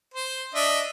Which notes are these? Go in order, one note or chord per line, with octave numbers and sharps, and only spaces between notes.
C5
D4 D#5 E5